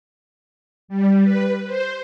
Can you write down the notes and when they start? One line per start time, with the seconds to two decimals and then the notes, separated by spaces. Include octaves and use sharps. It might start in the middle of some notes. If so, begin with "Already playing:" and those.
0.88 G3
1.23 B4
1.66 C5